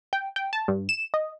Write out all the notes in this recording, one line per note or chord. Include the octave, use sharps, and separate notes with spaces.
G5
G5
A5
G2
E7
D#5